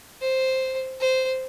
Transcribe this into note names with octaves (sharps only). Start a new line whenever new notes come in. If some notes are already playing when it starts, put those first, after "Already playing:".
C5
C5